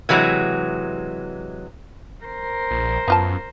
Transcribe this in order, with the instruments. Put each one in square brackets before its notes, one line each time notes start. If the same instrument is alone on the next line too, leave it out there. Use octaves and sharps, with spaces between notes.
[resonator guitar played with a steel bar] C3 E3 F#3 G#3
[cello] A#4 C5
[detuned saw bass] A#1
[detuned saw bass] F#2 [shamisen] B3 F4 A5